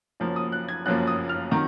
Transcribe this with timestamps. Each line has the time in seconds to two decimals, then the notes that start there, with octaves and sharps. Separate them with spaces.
0.20 F#1 F#2 F3 A#3
0.36 D#6
0.52 F#6
0.69 G#6
0.86 F#1 F#2 F3 A#3 F#6
1.07 D#6
1.29 F6
1.51 C3 D#3 F#3 A#5